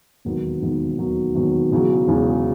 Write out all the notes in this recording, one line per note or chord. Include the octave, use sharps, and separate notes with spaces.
E1 D#2 D#3 F#3 B3
E1 D#2 D#3 F#3 B3
E1 D#2 D#3 F#3 B3
E1 D#2 D#3 F#3 B3
E1 E2 C#3 F#3
E1 E2 C#3 F#3